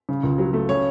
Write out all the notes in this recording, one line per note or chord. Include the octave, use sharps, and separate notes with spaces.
C#3
C#2
F#3
A3
C#3 C#5